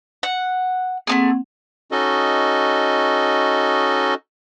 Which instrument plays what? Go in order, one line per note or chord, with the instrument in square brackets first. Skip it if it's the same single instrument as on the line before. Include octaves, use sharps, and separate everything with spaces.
[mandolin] F#5
[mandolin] A3 D#4 G#4 [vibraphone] A#3 C4 F#5
[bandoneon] C#4 D#4 F#4 A4 D#5